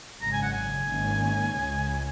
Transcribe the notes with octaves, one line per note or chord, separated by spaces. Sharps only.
G#1 F#2 C#3 G#3 A#5
G#5
F#5
G#5
G#1 G#2 D#3 A#3 C#4
C#2 C#3 G#3